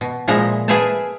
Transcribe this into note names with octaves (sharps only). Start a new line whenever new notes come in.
B2
A#2 F3 G#3 E4 A#5
G#4 B4 E5 F5 G5 A5